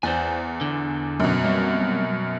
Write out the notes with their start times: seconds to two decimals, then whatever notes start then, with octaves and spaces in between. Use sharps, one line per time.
0.03 E2 C5 D5 G#5
0.61 D3
1.20 F#2 B2
1.44 G3 A#3 C4